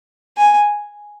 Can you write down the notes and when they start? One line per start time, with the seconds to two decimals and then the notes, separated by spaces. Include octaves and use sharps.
0.37 G#5